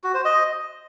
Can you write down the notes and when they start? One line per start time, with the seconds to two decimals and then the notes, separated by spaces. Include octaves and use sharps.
0.04 F#4
0.14 C5
0.25 D#5